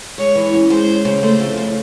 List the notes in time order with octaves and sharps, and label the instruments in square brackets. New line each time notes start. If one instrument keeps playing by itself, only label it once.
[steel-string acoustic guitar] G#3 [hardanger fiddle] C#5
[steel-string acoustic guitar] E3
C#4
[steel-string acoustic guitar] G#3 [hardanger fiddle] C5
[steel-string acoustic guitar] C#4
C#3
[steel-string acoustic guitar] A3 [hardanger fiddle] C5
[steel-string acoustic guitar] F2
C#3